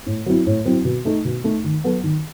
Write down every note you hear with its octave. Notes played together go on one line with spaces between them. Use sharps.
A2
F#3 C4 E4
A2
F#3 C4 E4
B2
A3 D#4 A4
B2
A3 D#4 A4
D#3
F#3 B3 F#4 A4
D#3